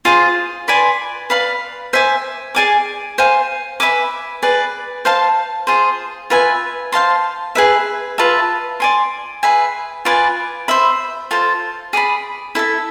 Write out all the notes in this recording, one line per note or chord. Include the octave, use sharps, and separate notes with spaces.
F4 G#4 C5
B4 D5 G#5 C6
B4 D5 F5 B5
C5 E5 G#5 D6
G#4 D5 G#5 D6
C5 F5 G#5
B4 E5 G#5 D6
G#4 B4 D5
C5 F5 A5
F4 G#4 C5
F4 B4 E5 G#5
C5 F5 A5 C6
G#4 B4 E5
F4 B4 E5 A5
D5 G#5 C6
G#4 B4 E5 G#5
F4 B4 D5 G#5
C5 E5 B5
F4 A4 C5
G#4 D5 G#5 B5
E4 A4 E5